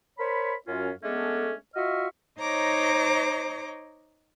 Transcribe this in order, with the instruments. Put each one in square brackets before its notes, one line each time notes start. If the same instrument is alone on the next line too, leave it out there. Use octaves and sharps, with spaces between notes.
[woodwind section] A#4 C5 C#5 B5
F#2 C#4 F4
G#3 A3 B3 C#4 D4 A4
F4 F#4 D#5 E5 C#6 F6
[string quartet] D#4 C5 C#5 D#5 A#5 D6